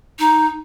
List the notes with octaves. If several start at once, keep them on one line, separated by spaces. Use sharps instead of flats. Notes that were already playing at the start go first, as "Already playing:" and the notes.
D#4